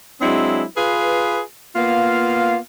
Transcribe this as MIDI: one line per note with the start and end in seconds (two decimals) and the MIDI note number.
0.21 0.63 54
0.21 0.63 56
0.21 0.63 60
0.21 0.63 62
0.21 0.63 64
0.76 1.40 65
0.76 1.40 68
0.76 1.40 71
1.75 2.56 58
1.75 2.56 59
1.75 2.56 65
1.75 2.56 77